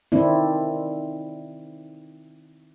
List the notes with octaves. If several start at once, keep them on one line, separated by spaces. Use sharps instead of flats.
D#3 C4 D4 E4